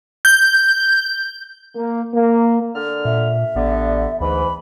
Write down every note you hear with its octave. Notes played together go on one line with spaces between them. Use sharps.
G6
A#3
A#3
D3 F6
A#2 E5
A1 D3 G3 B3
D2 G#2 E3 B5